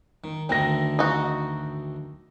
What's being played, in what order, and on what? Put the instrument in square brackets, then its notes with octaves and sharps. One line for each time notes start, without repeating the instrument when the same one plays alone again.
[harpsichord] D#3
[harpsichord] D2 D#3 A3 [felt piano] G5 A#6
[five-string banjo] D#4 F#4